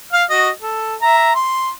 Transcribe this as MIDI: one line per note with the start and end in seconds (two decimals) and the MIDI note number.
0.12 0.24 77
0.12 0.24 89
0.30 0.49 66
0.30 0.49 75
0.61 0.95 69
1.02 1.32 76
1.02 1.32 82
1.35 1.70 84